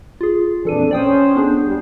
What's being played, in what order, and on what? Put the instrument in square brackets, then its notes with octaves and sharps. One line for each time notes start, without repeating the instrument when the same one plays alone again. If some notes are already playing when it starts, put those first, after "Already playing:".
[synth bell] F4 G#4
[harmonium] F2 A#2 D4 [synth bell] E3 A4 D#7
[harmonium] C#4 C5 [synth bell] D5 G5 D#6
[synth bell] B3 D4 G#4
[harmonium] E2 G3